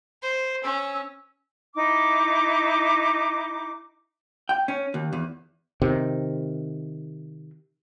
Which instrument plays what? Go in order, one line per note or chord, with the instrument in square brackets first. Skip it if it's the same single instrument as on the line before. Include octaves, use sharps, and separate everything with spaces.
[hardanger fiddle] C5
[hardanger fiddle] C#4 [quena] E6
[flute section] D#4 E4 D6
[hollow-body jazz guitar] G5
C#4
D#2
E2
[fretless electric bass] C3 D#3